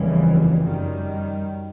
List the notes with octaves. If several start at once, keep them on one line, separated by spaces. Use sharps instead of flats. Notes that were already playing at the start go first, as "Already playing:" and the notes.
Already playing: F1 D#2 C#3 E3 G3
F#2 D#3 G3